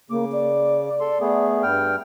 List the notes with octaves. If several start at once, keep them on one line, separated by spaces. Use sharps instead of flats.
C#3 A#3 D6
D5
A4 C6
A3 B3 G#4
G2 G5 F6